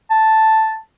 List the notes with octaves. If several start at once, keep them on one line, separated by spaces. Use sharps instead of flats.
A5